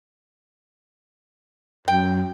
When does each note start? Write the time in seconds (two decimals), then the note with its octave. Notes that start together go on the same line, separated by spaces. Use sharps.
1.88 F#2 G5